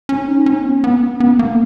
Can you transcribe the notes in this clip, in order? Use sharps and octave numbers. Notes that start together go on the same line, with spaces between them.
C#4
D#4
C#4
B3
B3
C#4
B3
A#3